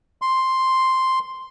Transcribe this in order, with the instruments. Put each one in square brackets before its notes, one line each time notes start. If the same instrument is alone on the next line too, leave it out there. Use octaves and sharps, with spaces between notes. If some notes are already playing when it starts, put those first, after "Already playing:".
[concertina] C6